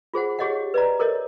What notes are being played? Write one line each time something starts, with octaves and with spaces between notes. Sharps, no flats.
F4 G#4 C5 F#5
G4 G#4 C#5 D#5 F5 F#5
B4 D5 D#5 A#5
A4 A#4 C#5 D#5